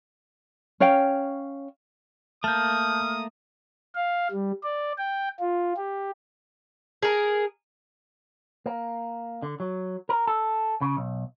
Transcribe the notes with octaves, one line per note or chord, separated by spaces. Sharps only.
C#4 C#5 F5 G5
A3 A#3 A5 D#6 F6 G6
F5
G3
D5
G5
F4
G4
G#4 A#4
A#3
D3
F#3
A#4
A4
C#3
B1